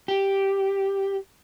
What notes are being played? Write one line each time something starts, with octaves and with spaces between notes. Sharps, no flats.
G4